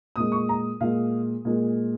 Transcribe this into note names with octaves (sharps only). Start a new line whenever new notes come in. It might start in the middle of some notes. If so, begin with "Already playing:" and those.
A#2 G#3 D#6
C#6
A#5
A#2 G#3 F5
A#2 G#3